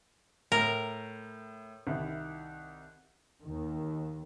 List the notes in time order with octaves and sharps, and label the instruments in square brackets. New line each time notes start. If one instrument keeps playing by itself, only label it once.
[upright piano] A2 [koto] A#4
[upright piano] C2 D#3 E4
[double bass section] D#2 D#3